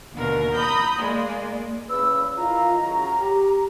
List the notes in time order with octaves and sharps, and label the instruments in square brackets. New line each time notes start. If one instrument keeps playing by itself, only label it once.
[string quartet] D#2 B2 D3 A#4
A#5 B5 D#6 G6
G#3 A#3 D5
[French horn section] E2 C#3 B4 [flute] E6
[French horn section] D#3 E4 F4 [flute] A#5
[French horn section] C#3 F#3
G4